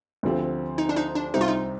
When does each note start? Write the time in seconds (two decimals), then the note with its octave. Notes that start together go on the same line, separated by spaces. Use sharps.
0.23 D2 D3 F3 C4 G4
0.78 D#4
0.89 D4
0.96 D#4
1.15 D4
1.33 C2 C3 G3 C4 D#4 G4
1.41 F4
1.48 D#4